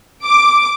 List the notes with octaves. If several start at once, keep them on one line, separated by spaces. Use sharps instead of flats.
D6